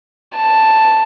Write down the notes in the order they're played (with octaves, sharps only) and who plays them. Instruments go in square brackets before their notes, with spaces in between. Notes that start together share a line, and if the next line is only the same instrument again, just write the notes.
[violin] A5